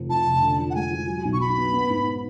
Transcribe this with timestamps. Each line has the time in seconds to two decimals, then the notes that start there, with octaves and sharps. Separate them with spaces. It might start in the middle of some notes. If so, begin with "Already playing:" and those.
Already playing: F1 F3
0.10 F2 A5
0.26 F1
0.42 D3
0.59 F3
0.70 F#5
0.75 G#3 G#5
0.91 F3
1.07 F#3
1.25 B1
1.33 C#6
1.40 F#3 B5
1.57 B3
1.73 B3
1.90 G#2